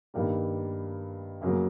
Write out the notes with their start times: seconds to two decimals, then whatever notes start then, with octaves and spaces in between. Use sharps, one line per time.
0.14 G2 D#3 G3 A#3
1.41 F#2 C#3 F#3 A#3